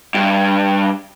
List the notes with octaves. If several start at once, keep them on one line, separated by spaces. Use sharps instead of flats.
G2